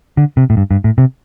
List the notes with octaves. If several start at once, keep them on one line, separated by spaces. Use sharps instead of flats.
D3
C3
A2
G2
G2
A2
C3